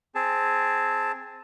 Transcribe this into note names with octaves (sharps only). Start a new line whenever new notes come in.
C4 G#4 A5